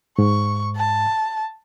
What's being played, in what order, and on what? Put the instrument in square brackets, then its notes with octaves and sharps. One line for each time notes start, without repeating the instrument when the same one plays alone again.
[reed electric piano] G#2 [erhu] C#6
[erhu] A5